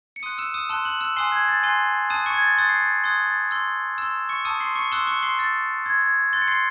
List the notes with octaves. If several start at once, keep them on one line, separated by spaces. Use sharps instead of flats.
C#7
C6 D#6 F#6 D#7
E6 E7
D#6 D#7
A5 C6 D#6 E6 F#6 E7
F#6 F#7
E6 E7
G#5 C6 D#6 F#6 C7
G#6
A6
G#5 C6 F#6 C7
A5 D#6 F#6 D#7
C#6 C#7
G#6
A6
C6 D#6 F#6 A6
C7
A6
C6 D#6 F#6 G#6
A6
C6 E6
E6 E7
C6
C#6 C#7
A5 C#6 D#6 E6 D#7
C6 C7
C#6 C#7
C6 D#6 E6 F#6 E7
C#6 C#7
C6 C7
C6 E6 A6
C6 E6 G#6
G#6
C6 F#6 A6
C#7
C6 C7